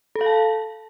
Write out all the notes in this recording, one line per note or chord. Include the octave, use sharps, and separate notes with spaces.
A4
F5
A5